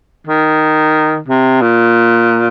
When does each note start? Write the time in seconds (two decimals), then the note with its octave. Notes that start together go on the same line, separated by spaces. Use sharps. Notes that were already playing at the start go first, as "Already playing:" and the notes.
0.27 D#3
1.28 C3
1.62 A#2